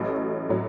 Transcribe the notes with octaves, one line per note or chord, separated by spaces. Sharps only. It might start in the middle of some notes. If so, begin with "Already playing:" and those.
Already playing: A1 A2 F#3
A2 F#3